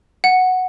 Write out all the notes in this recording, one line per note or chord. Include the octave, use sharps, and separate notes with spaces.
F#5